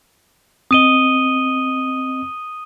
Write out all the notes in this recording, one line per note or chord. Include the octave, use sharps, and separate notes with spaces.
C4 D#5 D#6 D#7 G7